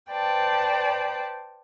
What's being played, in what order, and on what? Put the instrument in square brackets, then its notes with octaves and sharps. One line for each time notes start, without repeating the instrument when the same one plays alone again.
[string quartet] B4 C5 D5 G5 A5